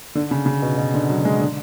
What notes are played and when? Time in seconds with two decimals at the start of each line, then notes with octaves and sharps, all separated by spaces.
0.15 D3
0.31 C#3
0.46 C#3
0.62 B2
0.77 B2
0.94 D3
1.10 F#3
1.25 G#3
1.40 D3